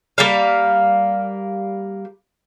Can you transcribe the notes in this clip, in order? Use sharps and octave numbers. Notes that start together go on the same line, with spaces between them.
G3 A#3 F5